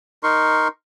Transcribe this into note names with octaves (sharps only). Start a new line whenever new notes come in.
D#4 A#4 C6 C#6